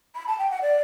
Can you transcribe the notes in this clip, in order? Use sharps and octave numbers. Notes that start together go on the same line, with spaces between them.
B5
A5
G5
F#5
D5